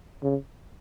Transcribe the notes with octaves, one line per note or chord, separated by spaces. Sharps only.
C#3